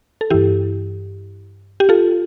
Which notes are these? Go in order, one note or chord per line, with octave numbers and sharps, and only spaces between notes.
A4
G2 E3 E4 G4
G4
F4 A4